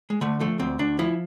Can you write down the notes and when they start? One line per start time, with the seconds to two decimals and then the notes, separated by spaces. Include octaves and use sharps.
0.10 G#3
0.21 D3 A3
0.40 F3 A3
0.59 D2 C4
0.79 D2 D4
0.99 F3 E4